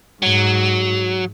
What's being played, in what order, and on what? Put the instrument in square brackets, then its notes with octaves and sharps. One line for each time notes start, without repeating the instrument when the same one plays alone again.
[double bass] G#2 [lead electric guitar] F#3